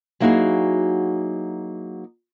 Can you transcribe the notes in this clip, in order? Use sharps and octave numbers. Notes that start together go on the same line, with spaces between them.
F#3 A#3 D#4 E4 F#4 G#4